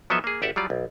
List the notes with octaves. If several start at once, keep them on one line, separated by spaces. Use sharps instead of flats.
F3 F#3 B3 A4 D#5 E5
A#3 G#4
G#1 G4 D5 E5 F#5
F#3 G3 F4 D5
B1